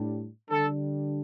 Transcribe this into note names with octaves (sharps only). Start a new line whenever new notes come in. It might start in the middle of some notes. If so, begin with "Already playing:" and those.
Already playing: A2 G3 D4
D3 G3 D4 A4